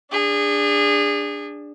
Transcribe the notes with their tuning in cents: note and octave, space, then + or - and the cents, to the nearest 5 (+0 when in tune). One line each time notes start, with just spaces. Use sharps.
D4 +0 G#4 -25